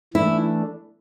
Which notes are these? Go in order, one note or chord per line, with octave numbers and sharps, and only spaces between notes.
E3 A3 D4 E4